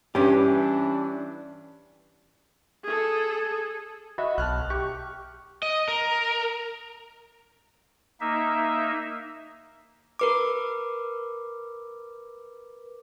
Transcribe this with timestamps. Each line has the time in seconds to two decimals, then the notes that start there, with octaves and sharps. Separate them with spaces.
0.15 G2 E3 C#4 D4 G4
2.84 G#4 A4
4.18 F#4 D#5 E5 B5
4.38 B1 A5 F6 F#6
4.70 G4 C#6
5.62 D#5
5.88 A#4
8.21 A#3 D#4 E5
10.19 A#4 B4 D6